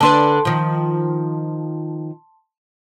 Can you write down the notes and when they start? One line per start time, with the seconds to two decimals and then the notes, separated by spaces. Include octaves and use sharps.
0.01 D3 D4 B4 A5 C6
0.45 D#3 F3